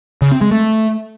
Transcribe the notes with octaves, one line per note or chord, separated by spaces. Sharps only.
C#3
C4
G#3
A3